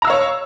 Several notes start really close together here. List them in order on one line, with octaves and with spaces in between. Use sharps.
A#5 E6 F5 C#5 C#6